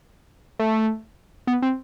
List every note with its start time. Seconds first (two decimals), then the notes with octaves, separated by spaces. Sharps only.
0.59 A3
1.47 B3
1.62 C4